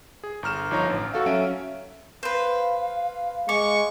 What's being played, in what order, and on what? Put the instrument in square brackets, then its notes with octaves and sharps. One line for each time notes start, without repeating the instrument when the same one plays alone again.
[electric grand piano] G#4
G1 A#5 F6 E7
G1 F3 D#4 C#5 A#5
A1
F#4 A4 F5
F#3 C#4 E5 D7
[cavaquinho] B4 C5 [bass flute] F5
[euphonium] G#3 [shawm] C#6 [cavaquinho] D6